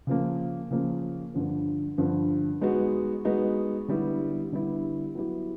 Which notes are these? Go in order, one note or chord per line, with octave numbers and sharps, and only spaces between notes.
C#3 F3 A#3
C#3 F3 A#3
G2 D3 F3
G2 D3 F3
G#3 B3 D#4 F#4
G#3 B3 D#4 F#4
D3 G3 B3 E4
D3 G3 B3 E4
F#3 B3 E4 G4